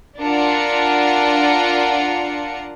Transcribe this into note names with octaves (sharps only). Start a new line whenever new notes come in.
D4 F4 A#4 F#5 C#7